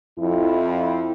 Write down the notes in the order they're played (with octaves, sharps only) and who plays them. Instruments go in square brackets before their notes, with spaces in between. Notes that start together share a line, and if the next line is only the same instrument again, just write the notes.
[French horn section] F2 E4